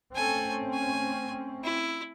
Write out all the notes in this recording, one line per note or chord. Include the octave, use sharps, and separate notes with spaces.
A3 C4 C#4 A4 G#5
G#5
E4